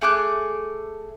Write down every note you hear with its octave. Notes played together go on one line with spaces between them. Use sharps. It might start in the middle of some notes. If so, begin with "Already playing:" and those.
A3 G#4 D6 F#6